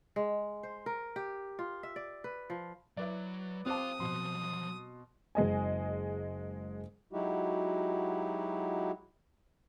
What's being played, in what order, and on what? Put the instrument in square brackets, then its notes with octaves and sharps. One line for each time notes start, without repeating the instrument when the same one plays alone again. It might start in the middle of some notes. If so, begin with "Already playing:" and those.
[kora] G#3
C5
A#4
G4
F4
E5
D5
B4
F3
[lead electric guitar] F#3 [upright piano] E4 B4 D5
[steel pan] C4 [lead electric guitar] F4 F5 [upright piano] A5 D6 F#6 [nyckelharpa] D#6
[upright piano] B2 C6 [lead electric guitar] F3 F#3
[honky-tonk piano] F#1 G#3 D#5 G#5
[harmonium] F#3 G#3 D#4 E4 F#4 G4